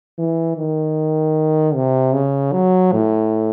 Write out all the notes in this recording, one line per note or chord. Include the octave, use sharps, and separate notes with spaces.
E3
D#3
C3
C#3
F#3
A2